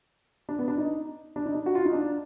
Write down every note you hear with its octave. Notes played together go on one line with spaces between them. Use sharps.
D4
B3
D4
D#4
D4
D#4
D4
F#4
F4
D#4
D4